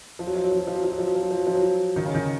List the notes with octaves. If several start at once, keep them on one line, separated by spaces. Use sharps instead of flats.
F3
F#3
F3
F#3
F3
F#3
F3
F#3
F3
F#3
F3
F#3
F3
F#3
F3
F#3
F3
F#3
F3
D#3
C#3
D#3